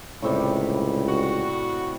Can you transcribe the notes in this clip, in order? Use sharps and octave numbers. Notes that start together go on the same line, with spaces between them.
C#2 A2 C3 G3
F#4